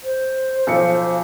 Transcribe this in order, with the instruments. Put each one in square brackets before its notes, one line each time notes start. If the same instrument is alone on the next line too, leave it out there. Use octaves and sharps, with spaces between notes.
[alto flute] C5
[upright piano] B1 F3 C#7